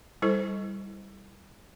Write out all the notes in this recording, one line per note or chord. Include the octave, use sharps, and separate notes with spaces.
G3 E4 A4 C5